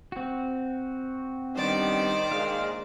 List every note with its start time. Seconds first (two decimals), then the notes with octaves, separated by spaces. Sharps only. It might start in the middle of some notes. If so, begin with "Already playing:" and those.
0.12 C4 F#4
1.56 D#3 G3 B3 D4 C5 D5
2.32 A#1 A#2 G#3 F5